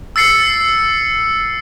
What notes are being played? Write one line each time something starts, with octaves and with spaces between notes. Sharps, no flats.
E6 A6 C7 C#7